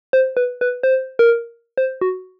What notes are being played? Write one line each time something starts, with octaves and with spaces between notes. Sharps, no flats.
C5
B4
B4
C5
A#4
C5
F#4